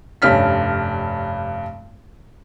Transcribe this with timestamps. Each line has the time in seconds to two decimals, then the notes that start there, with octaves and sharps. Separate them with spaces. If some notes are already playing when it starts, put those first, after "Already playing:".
0.22 F1 G2 C#4 F6 B6